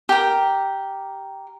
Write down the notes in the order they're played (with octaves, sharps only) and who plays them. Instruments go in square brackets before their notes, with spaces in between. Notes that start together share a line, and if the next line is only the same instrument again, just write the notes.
[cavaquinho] G4 A#4